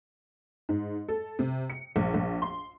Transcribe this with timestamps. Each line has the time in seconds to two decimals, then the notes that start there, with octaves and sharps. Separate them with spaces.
0.69 G#2
1.09 A4
1.39 C3
1.70 C#7
1.96 A#1
2.14 A#1
2.42 C6